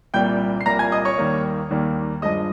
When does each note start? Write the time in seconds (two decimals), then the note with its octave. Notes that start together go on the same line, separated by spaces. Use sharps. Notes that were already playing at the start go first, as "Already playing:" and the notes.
0.14 C2 A#2 G3 A#3 G5 G6
0.61 C7
0.66 C2 A#2 G3 A#3 A#5 A#6
0.79 G#5 G#6
0.92 D#5 D#6
1.05 C#5 C#6
1.18 D#2 D#3 G3 A#3
1.70 D#2 D#3 G3 A#3
2.22 G2 F3 G#3 D#5 D#6